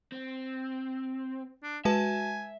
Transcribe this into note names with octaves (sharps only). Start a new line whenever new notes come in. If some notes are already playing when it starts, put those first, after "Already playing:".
C4
D4
G#3 F#4 B4 E5 G#5 A5